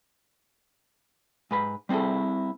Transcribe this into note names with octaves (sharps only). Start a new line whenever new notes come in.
G#2 B4 B5
G3 C4 E4 G#4 A4